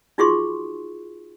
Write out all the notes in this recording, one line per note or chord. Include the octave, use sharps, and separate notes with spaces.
D#4 F4 F#4 G#4 C6 C#6